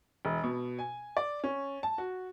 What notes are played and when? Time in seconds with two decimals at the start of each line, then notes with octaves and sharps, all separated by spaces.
0.25 E1
0.44 B2
0.79 G#5
1.17 D5
1.44 C#4
1.83 A5
1.98 F#4